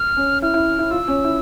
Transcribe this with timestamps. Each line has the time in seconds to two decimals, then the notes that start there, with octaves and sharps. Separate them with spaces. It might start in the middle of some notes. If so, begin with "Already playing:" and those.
Already playing: F6
0.17 C#4
0.42 E4 F6
0.54 E4
0.79 E4
0.91 F4 E6
1.08 C#4
1.24 E4